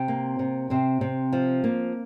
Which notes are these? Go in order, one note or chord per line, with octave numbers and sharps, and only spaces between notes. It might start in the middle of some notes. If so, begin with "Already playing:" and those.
Already playing: C3 C4
A#3
C3
C3 C4
C3
F3
A#3